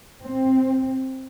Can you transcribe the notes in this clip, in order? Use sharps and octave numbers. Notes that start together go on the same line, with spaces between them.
C4